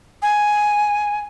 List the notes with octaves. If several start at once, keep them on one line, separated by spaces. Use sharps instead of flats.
G#5